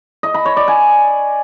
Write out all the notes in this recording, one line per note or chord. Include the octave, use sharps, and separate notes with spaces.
D#5
B5
C#5
D5
G#5